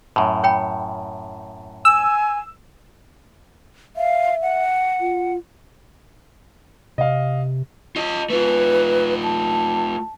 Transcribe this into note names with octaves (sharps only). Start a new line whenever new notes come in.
F#2 A2
C#5 G5 B5
G#5 E6
E5 F5
F#5
F4
C3 D#5 F5
F4 D#5
A3 F4 B4
A5